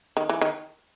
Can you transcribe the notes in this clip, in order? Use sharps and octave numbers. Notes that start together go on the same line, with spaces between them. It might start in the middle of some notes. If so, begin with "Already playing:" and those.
D#3
E3
D#3